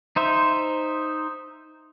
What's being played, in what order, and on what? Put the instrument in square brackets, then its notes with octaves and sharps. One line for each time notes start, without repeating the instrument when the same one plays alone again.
[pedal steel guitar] D#4 C5 E5